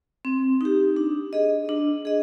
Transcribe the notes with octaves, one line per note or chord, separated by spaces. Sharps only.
C4
D#4 G4
D4
G#4 D#5
D4
G#4 D#5